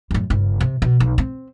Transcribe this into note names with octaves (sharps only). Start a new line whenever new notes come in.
F#2 A2
G1 C#3
C3
B2
B1
C4